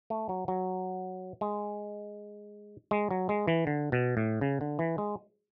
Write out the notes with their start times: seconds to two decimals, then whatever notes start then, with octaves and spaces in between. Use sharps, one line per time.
0.10 A3
0.29 F#3
0.48 F#3
1.41 G#3
2.91 G#3
3.11 F#3
3.29 G#3
3.48 E3
3.67 D3
3.92 B2
4.17 A2
4.41 C#3
4.61 D3
4.79 E3
4.98 G#3